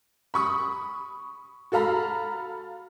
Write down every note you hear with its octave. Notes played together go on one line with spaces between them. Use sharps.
B5 C#6 D#6
F#4 A4 F5 A#5 B5